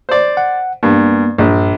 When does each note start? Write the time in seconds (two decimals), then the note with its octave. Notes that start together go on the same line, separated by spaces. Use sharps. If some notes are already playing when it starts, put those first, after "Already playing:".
0.09 C5 D5
0.37 F#5
0.83 G2 A#3 B3
1.38 A#1 G2